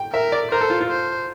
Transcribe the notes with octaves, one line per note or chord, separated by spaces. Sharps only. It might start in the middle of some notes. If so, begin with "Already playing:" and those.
Already playing: G5
A#4 E5
D5
A#4 C5
A4
F4
F4
C5